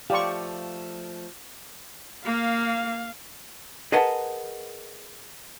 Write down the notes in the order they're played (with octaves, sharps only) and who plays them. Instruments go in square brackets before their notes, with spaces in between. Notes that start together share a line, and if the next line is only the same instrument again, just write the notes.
[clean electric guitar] F3 A3 [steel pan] G4 D5 C#6 [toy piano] F5 C6
[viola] A#3 [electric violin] F5
[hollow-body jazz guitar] G#4 A#4 B4 D#5 F#5 A5